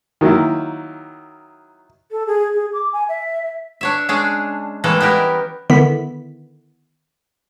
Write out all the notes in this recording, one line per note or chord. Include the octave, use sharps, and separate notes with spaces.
D#3 F#3 A#3 E4
A4
G#4
G#4
D6
G#5
E5
D4 C#5 E5
G#3 C#4 D4 G#4 C#5
E3 G3 G#3 A#3 A4 C#5
B3 E4 G4 A#4
D3 D#3 B3 E4 B6